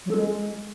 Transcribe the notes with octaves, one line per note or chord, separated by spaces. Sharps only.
F#3
A4
G#3